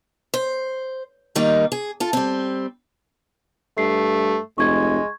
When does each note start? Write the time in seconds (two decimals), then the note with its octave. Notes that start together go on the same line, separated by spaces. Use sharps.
0.34 C5
1.35 D#3 G3 A#3 D#4
1.72 G#4
2.00 F4 A4
2.13 G3 C4
3.78 G2 A3 C7
4.58 F1 G#3 C#6 G#6